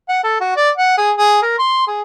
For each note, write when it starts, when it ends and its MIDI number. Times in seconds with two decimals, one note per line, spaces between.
0.09 0.23 78
0.24 0.37 69
0.41 0.55 66
0.56 0.70 74
0.77 0.93 78
0.97 1.11 68
1.17 1.40 68
1.42 1.54 70
1.59 1.86 84
1.87 2.02 68